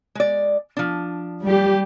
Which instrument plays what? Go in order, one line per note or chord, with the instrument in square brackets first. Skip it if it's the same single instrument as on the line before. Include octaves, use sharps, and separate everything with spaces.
[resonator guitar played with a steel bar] G#3 D5
F3 D4
[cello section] G3 G4